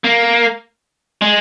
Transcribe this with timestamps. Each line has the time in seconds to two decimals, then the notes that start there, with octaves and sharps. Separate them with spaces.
0.04 A#3
1.22 G#3